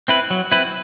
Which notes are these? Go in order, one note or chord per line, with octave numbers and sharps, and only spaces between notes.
C4 E4 B4
F#3
C4 E4 B4